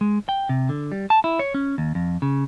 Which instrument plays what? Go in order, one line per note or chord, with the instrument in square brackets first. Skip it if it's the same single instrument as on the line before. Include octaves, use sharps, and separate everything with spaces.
[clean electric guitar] G#3
G5
C3
D3
G3
A5
E4
C#5
C#4
D#2
F2
C#3